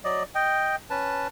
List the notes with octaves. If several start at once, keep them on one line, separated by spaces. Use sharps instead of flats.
F#3 D5 D#5
D#5 G5
C#4 B4 A5